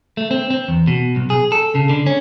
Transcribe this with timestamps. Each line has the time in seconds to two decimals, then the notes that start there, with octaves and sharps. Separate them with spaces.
0.17 A3
0.31 C4
0.50 C4
0.68 E2
0.87 B2
1.16 B1
1.30 G#4
1.52 A4
1.75 C#3
1.89 D3
2.06 C#4